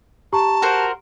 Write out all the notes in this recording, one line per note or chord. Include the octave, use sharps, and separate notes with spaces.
G4 A5 A#5 C#6
F#4 A#4 C5